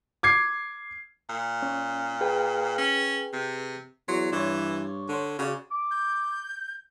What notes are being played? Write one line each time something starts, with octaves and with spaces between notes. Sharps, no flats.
D6 G#6 C7
A#2
C#4
G#4 B4 G5
C#4
C3
E2 F#3 C6 D#6
G2 E3 C#5 D5
D3 C5 C#5
C#3 F#4 D5
D6
G6